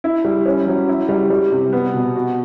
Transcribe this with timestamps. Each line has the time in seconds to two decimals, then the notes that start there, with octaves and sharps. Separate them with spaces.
0.04 E4
0.25 G3
0.46 C#4
0.67 F#3
0.89 E4
1.09 G3
1.30 G3
1.52 C3
1.73 B3
1.94 B2
2.15 F#4